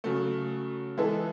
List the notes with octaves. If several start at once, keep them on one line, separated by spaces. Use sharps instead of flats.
C#3 F#3 A3
E3 G#3 B3 E4 A4